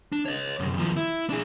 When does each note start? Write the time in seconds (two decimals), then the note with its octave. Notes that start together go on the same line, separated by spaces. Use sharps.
0.12 D4
0.26 C#5 D#5
0.60 C2 F#2
0.77 D#2 F3
0.96 E4
1.30 D4 G#4